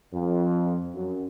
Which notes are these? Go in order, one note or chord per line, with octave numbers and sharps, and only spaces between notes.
F2
F#2